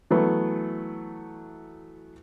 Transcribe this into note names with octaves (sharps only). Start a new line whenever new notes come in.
E3 F#3 A3 B3